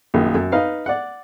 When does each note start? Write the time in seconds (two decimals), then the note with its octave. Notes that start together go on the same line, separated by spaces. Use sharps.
0.14 A#1 F#2 D#3
0.35 F#2
0.52 D#4 B4 F5
0.86 D5 F#5